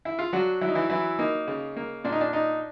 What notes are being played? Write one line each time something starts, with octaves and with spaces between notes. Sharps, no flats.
E4
F4
F#3 D4 F#4
F#3 E4
D#4
E3 E4
E3 F#3 E4
A#3 D#4
C#3
A#3
A#2 D4
D#4
D4
D4 D#4